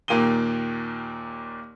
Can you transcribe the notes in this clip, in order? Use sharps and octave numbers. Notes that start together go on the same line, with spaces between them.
D#2 A#2 A#3 G4 D#7 G7